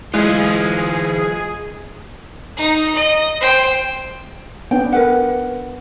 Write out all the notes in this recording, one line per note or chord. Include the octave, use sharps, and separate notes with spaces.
E3 G#3 E4 F4 G#4
D#4
D#5
C5 G5
B3 D4 G5
A#4 B4 F#5